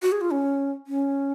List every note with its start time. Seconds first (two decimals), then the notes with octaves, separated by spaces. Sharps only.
0.02 F#4
0.12 G#4
0.21 F4
0.31 C#4
0.87 C#4